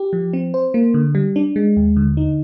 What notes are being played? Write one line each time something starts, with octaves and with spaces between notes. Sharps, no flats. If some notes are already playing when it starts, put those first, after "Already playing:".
Already playing: G4
F3
C4
C5
A#3
D3
G3
D4
G#3
D#2
D3
D#4